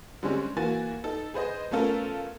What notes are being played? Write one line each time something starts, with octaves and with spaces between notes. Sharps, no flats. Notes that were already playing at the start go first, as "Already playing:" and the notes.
D3 G3 G#3 C4 C#4
E3 A#3 F#4 G#5 A6
D#4 A4
G#4 B4 C5 D#5
A3 B3 C#4 F4 A4 A#4